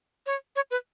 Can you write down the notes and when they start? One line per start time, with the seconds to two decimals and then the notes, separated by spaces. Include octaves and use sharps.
0.26 C#5
0.56 C#5
0.71 B4